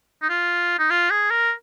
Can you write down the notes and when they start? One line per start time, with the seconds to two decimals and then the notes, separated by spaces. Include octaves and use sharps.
0.22 D#4
0.29 F4
0.79 D#4
0.90 F4
1.11 G#4
1.30 A#4